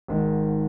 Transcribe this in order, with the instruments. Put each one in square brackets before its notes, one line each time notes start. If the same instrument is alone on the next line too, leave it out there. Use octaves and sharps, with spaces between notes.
[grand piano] G#1 G#2 D#3